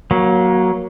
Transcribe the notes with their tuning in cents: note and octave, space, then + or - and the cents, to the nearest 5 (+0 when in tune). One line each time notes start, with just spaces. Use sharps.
F#3 +0 A#3 +20